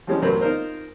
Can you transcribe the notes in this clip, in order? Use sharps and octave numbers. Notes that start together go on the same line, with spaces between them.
E3 F3 G3 G#3 C#4
A1 F#2 F#3 B4 C5 C6
D#4 F4 A#4 C5